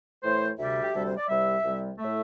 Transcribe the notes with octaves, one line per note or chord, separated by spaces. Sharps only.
A2 E3 A3 C5
D2 C3 G3 E5
G4
D2 C3 G3 A4
C5
D5
C2 C3 G3 E5
C2 C3 G3
A2 A3 E5